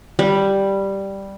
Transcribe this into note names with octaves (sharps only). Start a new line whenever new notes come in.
G3